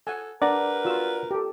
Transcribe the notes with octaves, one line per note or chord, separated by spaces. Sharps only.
A4 F#5 G#5
D4 A#4 B4 D5 F#5 A#5
F4 F#4 E6
G4 A4